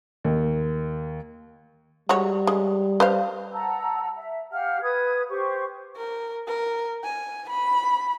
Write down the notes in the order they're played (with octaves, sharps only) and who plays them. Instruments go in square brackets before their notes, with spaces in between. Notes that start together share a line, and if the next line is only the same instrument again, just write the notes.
[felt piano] D#2
[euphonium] G3 [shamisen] G#3 F#4 C#5
[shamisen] G#3
B4 C5 F5
[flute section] F#5 A5 A#5 E6
E5
G4 F5 F#5 F6
B4 D#6 G#6
G4 C5 C#6
[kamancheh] A#4
A#4
G#5
B5